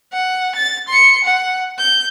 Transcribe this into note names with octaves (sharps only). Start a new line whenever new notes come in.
F#5
A6
C6 C#7
F#5
G6